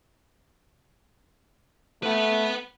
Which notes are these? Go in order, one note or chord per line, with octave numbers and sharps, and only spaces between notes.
A3 B4 F#5